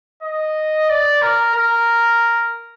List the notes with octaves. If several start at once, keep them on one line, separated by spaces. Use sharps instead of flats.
D#5
D5
A#4
A#4